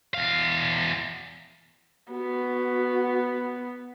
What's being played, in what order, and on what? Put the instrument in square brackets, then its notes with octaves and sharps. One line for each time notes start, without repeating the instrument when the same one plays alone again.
[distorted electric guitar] E2 F5
[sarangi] B3 [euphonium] F#4